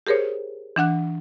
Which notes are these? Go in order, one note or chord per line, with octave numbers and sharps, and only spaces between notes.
G4 G#4 A#4 C5 C#5
E3 D4 F#5 F#6